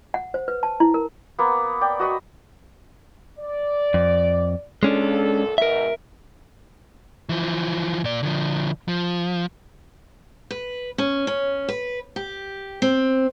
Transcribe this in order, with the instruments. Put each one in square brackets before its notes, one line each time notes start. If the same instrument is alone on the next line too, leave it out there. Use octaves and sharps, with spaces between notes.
[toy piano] F#5
C5
B4
A5
E4
A#4
[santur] A#3 B3
D5 G5
F#4 D#5 B5 C#6
[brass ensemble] D5
[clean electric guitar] F2
[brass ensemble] C#2 A#2 A4 [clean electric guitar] G#3 C#4 D4
[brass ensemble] G#2 B2 [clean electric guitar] A#4 E5
[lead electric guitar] E3 F3
A#2 D5
D3 F3
F3
[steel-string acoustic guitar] B4
C#4
C#4
B4
G4
C4